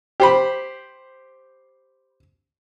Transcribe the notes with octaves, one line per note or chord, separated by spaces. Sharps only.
G4 C5 B5